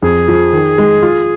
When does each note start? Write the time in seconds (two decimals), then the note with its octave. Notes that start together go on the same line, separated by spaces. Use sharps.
0.02 F2 G#4
0.28 F3
0.53 D#3
0.78 G#3
1.03 F4